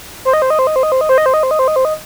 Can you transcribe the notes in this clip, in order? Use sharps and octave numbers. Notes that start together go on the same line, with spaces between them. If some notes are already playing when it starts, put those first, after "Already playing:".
C5
D#5
C5
D#5
C5
D#5
C5
D#5
C5
D#5
C5
D#5
C5
D#5
C5
D#5
C5
D#5
C5
D#5